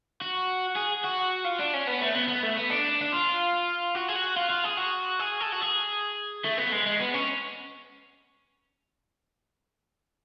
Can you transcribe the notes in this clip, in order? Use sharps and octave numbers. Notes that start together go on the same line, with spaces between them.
F#4
G#4
F#4
F4
D4
C#4
B3
A3
B3
B3
A3
B3
D4
D4
F4
F#4
G#4
F#4
F4
F4
G#4
F#4
G#4
A4
F#4
G#4
A3
B3
G#3
G#3
B3
C#4